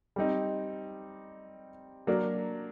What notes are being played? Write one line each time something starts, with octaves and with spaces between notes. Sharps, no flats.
G3 C4 D#4
F#3 A#3 D4